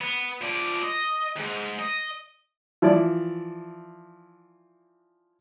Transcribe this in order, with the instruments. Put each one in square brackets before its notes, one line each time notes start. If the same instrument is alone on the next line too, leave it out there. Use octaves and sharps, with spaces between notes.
[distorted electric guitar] B3
F3 D5
D#5
D#2 G#2
D#5
[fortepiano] E3 F3 E4 D5